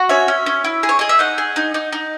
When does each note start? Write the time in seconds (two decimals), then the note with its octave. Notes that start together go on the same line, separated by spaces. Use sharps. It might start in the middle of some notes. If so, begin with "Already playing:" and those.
Already playing: F#4
0.09 C#4 C#5 E5
0.28 C#4
0.46 C#4
0.64 E4
0.83 G#4
0.89 C#5
0.99 G#4 D#5
1.09 E5
1.19 D#4 D#5 F#5
1.38 G#4
1.56 D#4
1.74 D#4
1.93 D#4